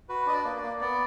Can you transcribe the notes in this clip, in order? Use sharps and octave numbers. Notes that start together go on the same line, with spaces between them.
F#4 B4
D4 D#5
D5
A#3
D5
A#3
B3 D5